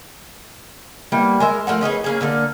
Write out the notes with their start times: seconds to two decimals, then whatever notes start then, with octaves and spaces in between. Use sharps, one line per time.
1.12 G3 A#3 B3 E4
1.40 G#3 A#4 E5
1.67 F3 A3 A#4 F#5
1.81 C#4 D#4 G#4 B4
2.04 A#3 C#4 G#4
2.21 D3 A#3 A4